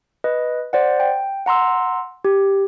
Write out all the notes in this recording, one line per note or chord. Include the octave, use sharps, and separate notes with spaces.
B4 D#5
C5 D5 F#5
G5
F#5 A#5 C6 E6
G4